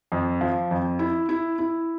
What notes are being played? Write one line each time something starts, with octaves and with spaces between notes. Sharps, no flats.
F2
F3
F2
E4
E4
E4